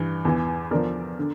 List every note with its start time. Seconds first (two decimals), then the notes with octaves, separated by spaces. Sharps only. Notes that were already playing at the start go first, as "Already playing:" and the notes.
Already playing: G2 E3
0.25 E2 E3
0.71 E2 D3 F3 A#4 D5
1.19 D3